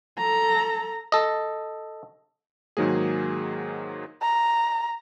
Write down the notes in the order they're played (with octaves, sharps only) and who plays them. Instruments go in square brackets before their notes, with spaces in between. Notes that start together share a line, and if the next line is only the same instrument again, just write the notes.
[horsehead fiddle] A4 A#5
[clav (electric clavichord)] A4 D#5
[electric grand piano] G#2 D#3 F#3 A#3 G#4
[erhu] A#5